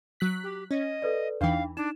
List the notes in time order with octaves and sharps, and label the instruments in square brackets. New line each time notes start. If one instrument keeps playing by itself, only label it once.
[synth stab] F#3 F#6 B6
[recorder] G4
[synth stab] C#4 [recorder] D#5
[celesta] A4 B4 D5
[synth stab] E2 E3 [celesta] D4 D#4 G5 [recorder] F5
[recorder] D4 [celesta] D#4 E7